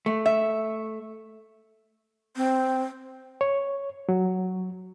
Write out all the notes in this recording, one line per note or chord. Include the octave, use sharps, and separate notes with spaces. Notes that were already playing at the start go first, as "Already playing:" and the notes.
A3
E5
C4
C#5
F#3